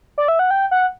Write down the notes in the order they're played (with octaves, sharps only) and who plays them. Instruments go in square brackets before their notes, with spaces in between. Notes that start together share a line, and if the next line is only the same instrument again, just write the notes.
[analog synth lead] D5
E5
F#5
G5
F#5